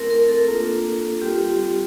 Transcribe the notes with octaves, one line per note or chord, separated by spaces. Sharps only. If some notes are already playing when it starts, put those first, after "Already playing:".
Already playing: A3 C4 E4 A#4
A#4
A4
A#3 D4 F4
G3 C4 F4 G4